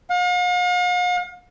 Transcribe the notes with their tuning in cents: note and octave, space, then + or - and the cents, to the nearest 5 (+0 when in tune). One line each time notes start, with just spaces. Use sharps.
F5 +45